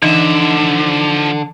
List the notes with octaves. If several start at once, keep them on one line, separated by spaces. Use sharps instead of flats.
D3 E3 F3 D#4 E5